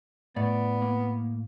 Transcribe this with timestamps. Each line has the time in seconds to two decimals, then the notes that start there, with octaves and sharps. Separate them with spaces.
0.36 A2 B3 D5
0.82 A#3